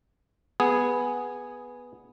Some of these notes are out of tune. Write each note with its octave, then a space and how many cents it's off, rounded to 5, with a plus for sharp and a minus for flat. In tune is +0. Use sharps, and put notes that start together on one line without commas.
B3 -5 G#4 +0